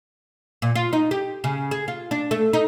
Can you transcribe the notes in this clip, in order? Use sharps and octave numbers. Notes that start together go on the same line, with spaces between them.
A#2
F4
D#4
G4
C#3
G#4
F4
D4
A3
D#4